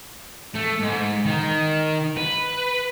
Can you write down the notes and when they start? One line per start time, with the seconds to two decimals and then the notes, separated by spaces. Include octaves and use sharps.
0.55 A3
0.81 G#2
1.26 D#3
2.17 B4